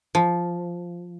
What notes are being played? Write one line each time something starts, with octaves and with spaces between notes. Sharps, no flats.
F3